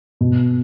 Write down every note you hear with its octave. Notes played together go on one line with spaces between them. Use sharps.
B2